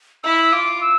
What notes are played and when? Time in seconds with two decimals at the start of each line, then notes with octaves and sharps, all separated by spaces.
0.24 E4 E6
0.52 F4 D6
0.81 E6